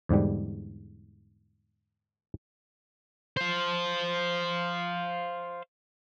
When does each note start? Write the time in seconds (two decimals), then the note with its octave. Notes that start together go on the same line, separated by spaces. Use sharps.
0.09 E2 G#2 D3 G3
3.37 C5 F5